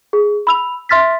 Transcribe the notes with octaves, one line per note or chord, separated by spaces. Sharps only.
G#4
B5 E6 F7
E5 C6 F6 A6 B6